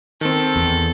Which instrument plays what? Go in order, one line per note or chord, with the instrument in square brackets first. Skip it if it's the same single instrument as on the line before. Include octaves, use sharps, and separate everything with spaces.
[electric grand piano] D#3 C4 [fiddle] A4
[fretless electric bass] E2